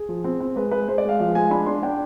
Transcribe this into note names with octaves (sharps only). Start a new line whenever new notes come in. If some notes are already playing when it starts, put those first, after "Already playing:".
Already playing: G#4
F3
C4
C4
G#3 B4
G#3 B4
G#3 C5
D5
G#3 F5
F3 F5
G#3 G#5
D4 B5
D4 C6
D4 G5